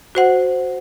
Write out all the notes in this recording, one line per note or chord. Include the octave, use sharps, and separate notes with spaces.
F#4 C5 F#5